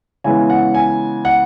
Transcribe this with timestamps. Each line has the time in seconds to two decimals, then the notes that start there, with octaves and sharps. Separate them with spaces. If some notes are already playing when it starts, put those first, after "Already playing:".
0.24 C#3 E3 G#3 B3 G#5
0.50 F#5
0.74 G#5
1.25 F#5